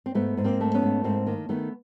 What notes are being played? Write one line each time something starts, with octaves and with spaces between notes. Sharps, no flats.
C4
G#2 A3 B3
G#2
A#3 C4
A3
B3 C#4
G#2
G#2 A#3 C4
D#3 A#3
D#3 A3 B3